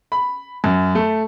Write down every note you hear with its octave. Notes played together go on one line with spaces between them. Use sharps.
B5
F#2
A3